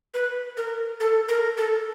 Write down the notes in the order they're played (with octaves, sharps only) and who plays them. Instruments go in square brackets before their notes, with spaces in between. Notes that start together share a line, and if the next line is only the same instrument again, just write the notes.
[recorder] B4
A#4
A4
A#4
A4